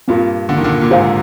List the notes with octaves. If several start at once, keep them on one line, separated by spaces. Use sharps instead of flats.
G2 A#2 C4 F4 A#4
D3
D#3
A#2 D3
A#2
G#2 C3 G4 C5 F5 G#5